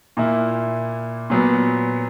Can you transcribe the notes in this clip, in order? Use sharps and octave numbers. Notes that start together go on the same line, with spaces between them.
A#2 A#3 E4
A#2 F#3 B3